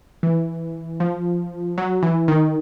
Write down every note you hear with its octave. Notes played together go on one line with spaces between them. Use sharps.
E3
F3
F#3
E3
D#3